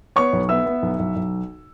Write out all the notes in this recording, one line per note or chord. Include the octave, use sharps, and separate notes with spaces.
B3 C#5 C#6
B1
B3 E5 E6
B3
B1
B1
B1